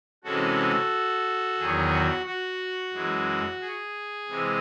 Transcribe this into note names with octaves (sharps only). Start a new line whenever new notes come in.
C3 E3 G#3 C#4 F#4 A4
E2 D#3 F#3 G#4
F#4
F#4
F#2 E3 G#3
G#4
C3 E3 G#3